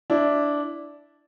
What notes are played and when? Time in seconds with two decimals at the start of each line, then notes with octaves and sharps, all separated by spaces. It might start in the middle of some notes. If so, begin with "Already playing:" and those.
0.10 D4 E4